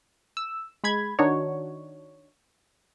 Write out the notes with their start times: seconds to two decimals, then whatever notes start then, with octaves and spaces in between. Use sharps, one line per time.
0.37 E6
0.84 G#3 B5 G#6
1.19 D#3 D4 D#4 F#4 C#5